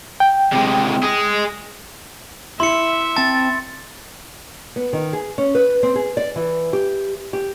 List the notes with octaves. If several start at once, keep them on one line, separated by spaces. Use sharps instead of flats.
G5
C3 G#3
G#4 D#5
E4 E5 C6 C#7
C4 A5 A6
B3
D#3
G#4
C#4
B4
C4
G#4
D5
E3
G4
G4